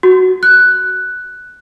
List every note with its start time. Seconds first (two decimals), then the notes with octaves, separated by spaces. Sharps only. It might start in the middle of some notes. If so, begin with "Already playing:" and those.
0.03 F#4
0.43 F#6